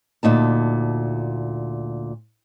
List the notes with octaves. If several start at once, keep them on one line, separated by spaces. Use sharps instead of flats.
D2 A#2 D#4 A5